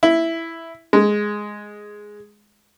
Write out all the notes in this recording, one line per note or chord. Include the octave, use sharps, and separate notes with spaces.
E4
G#3